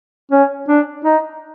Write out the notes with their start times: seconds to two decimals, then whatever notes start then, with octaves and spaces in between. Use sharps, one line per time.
0.31 C#4
0.68 D4
1.05 D#4